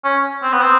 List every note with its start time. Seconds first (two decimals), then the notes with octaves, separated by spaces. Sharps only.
0.04 C#4
0.43 C4
0.53 B3
0.61 C4